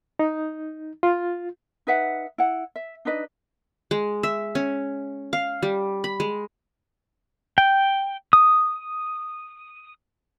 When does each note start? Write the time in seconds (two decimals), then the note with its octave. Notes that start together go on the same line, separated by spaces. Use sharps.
0.19 D#4
1.03 F4
1.87 D#4 B4 E5 F#5
2.38 E4 F#5
2.76 E5
3.05 D4 D#4 B4 D#5
3.91 G#3
4.23 E5
4.55 C#4
5.33 F5
5.63 G3
6.04 B5
6.20 G#3
7.58 G5
8.33 D#6